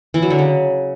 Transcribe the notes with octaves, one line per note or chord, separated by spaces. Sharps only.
E3
F#3
D3
C#3